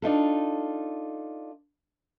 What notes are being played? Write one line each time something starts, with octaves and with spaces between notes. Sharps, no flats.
D4 D#4 F4 A4